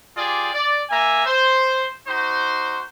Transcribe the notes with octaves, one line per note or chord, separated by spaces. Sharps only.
F4 G4 G#4 D5
D5
A#3 E5 G#5 A#5
C5
D#4 F#4 C5